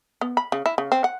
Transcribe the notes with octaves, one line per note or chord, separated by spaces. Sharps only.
B3
B5
C#3
E4
C#3
C4
F#5